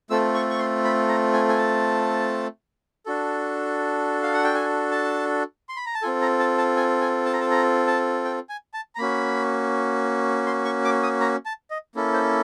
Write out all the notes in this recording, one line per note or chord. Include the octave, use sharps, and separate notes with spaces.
A3 C4 F4 A4 E6
C#6
C#6
C6
B5
A#5
G#5
G#5
A5
D4 F#4 A4
F5
F#5
G5
G#5
A5
C6
B5
A#5
A5
C4 F4 A4 G#5
A#5
A5
A5
G#5
G#5
A5
A#5
A5
A#5
A5
G5
G#5
A5
A#5
A#3 C#4 F#4 B5
C6
C#6
D6
D#6
A#5
A5
D#5
A#3 C#4 E4 A4
C5